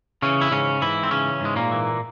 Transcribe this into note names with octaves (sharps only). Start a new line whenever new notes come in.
C#3 E3 C#4
E4
G#2 C#3 C#4
G#2 E3 E4
C4
C#3 E3 C#4
G#2 G#3
A#2 A#3
E3